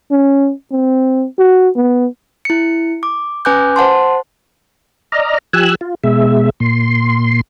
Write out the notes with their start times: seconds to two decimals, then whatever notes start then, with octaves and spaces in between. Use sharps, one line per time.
0.11 C#4
0.71 C4
1.38 F#4
1.76 B3
2.45 E4 C#7
3.03 D6
3.45 C#4 B4 G#5 D6 F#6 G6
3.76 C5 F#5 A5 C6
5.12 D5 D#5 A#5 F6
5.53 F3 G4 G#5 E6 F#6
5.81 F4
6.04 B2 G#3 E5
6.60 A#2 C6